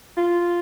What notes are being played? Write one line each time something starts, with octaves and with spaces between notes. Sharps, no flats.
F4